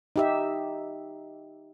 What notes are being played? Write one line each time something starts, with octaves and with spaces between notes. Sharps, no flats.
D#4 G4 E5